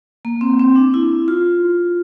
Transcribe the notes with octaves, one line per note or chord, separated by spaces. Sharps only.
A#3
C4
C4
D4
E4
F4